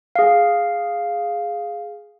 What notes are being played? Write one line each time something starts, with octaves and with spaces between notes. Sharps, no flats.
G#4 F5